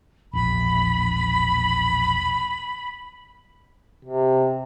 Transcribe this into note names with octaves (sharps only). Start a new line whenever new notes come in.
E1 A#1 B5
C3